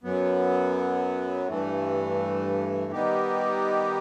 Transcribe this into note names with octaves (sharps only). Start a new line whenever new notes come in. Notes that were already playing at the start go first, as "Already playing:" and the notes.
F#2 F#3 B3
G2 E3 A3
D#3 G3 B3 D#4 G4